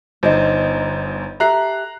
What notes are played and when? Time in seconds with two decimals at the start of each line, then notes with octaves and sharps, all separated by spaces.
0.23 G1 D#4 C5 D#5
1.40 G4 A4 E5 A#5 F#6 C7